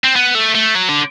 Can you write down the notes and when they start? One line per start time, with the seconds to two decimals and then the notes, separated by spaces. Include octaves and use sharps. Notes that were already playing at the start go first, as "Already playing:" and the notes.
0.04 C4
0.16 B3
0.35 A3
0.55 A3
0.75 F#3
0.88 D3